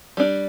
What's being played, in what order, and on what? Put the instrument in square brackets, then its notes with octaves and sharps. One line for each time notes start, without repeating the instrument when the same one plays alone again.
[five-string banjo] G3 D4